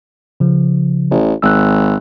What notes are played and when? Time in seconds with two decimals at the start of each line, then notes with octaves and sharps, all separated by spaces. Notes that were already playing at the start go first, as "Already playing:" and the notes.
0.40 C#3 F3
1.11 A1
1.42 G#1 E6 F#6